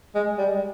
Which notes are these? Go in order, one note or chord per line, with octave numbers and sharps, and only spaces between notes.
G#3
G3